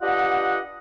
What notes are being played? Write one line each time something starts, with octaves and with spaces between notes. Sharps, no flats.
D4 F4 G4 B4 D#5 F#5